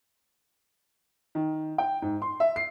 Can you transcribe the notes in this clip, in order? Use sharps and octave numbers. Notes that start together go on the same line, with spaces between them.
D#3
G5
G#2
C6
E5
C7